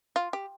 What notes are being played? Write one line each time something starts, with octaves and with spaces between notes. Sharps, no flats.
F4
G4